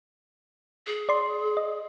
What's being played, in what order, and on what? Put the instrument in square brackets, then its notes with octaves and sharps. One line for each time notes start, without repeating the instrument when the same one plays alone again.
[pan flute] G#4
[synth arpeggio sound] D5 C6
D#5